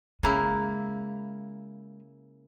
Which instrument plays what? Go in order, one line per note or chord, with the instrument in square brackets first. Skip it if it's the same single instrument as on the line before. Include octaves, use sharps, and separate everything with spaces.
[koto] C#3 A#3 E4 [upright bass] G#3